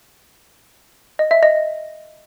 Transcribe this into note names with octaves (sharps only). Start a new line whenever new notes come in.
D#5
E5
D#5